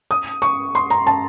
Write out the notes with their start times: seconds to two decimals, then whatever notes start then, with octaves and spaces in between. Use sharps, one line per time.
0.11 D#6
0.42 C#6
0.75 C6
0.90 A#5
1.07 A5